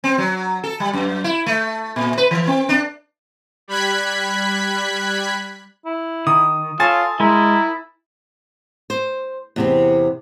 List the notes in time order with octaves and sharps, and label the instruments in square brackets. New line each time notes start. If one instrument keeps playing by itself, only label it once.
[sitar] C4
F#3
A4
G3
F#2
E4
A3
A#2
B4
E3
C4
D4
[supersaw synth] G3 B5 F#6 G#6 B6
[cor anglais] E4
[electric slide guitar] D#3 [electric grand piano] D#6
[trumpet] F4 [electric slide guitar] A4 [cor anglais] C#5 [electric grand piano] G#5 A6
[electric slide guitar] G#3 [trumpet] E4 [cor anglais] A#4
[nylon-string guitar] C5
E2 C3 C4